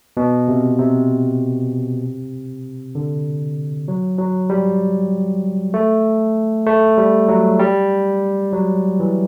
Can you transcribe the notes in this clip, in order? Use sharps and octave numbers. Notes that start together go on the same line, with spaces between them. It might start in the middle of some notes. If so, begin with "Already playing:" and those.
B2
C3
C3
D3
F#3
F#3
G3
A3
A3
G3
F#3
G3
F#3
E3